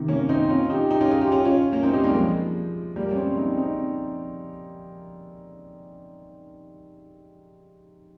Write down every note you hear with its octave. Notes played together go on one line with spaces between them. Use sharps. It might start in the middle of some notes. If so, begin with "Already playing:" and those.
Already playing: C3 D#3
A#3 C#4
C4 D#4
C#4 F4
D#4 G4
D#4 G4
C#4 F4
F4 G#4
D#4 G4
C#4 F4
C#4 F4
A#3 C#4
C4 D#4
D#4 G4
G3 A#3
F3 G#3
G3 A#3
C#4
G#3 C4
C4 D#4
C4 D#4